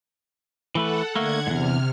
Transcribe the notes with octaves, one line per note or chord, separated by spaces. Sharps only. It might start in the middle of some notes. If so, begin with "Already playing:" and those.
E3 A3 A4 B4 F#5
D3 A3 A#3 F#5 G#6
E2 G#2 C3 F6